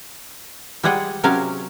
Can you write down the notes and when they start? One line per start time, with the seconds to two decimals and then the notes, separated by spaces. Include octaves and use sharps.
0.83 G3 G#3 G#4 F#5 G5
1.23 C3 F#3 C#4 A#4 F5